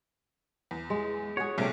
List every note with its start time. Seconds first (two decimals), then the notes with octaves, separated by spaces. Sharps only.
0.71 E2
0.90 G#3
1.37 F#4 G#4 C#5
1.58 A#1 C3 G3 A3 C#4 G4